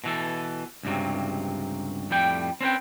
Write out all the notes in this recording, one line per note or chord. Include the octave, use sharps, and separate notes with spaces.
B2 E3 A4
C#2 G2 C3 F#3
F2 A2 G3 G5
C4 C#4 B4 G5